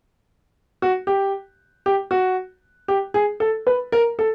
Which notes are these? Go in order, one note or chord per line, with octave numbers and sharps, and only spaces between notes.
F#4
G4
G4
F#4
G4
G#4
A4
B4
A#4
A4